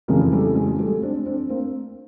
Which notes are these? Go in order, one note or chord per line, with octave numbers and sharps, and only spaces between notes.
F2 C#3 E3 G#3 A#3
G3 A3
G#3
G3 A3
C4 D4
C4 D4
A#3 C4